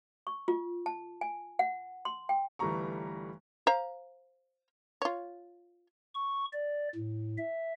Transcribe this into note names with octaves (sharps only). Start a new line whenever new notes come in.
C#6
F4
A5
G#5
F#5
C6
G5
G1 E3 G3 A3 A#5 C#6
C5 F5 A#5
F4 C#5
C#6
D5
A2
E5